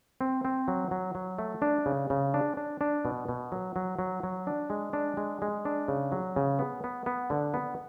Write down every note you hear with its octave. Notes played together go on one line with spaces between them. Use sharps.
C4
C4
F#3
F#3
F#3
A3
D4
C#3
C#3
D4
D4
D4
B2
B2
F#3
F#3
F#3
F#3
D4
G#3
D4
G#3
G#3
D4
C#3
F#3
C#3
B3
B3
B3
D3
B3